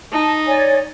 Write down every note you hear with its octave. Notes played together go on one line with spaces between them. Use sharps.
D#4 A5
C#5 D5 G#5